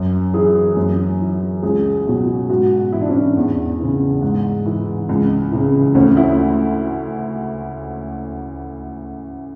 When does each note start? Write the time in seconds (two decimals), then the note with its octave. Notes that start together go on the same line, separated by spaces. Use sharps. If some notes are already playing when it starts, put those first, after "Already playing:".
Already playing: F#2
0.34 E3 G#4
0.76 F#2
1.20 E3
1.63 C#2 G#4
2.07 B2 F#3
2.50 G#2 F#4
2.92 E3 E4
3.01 D4
3.09 C#4
3.17 D4
3.36 E2
3.79 C#3 E3
4.22 G#2
4.66 E3
5.09 C#2
5.51 C#3 E3
5.95 D2 C#4
6.17 E4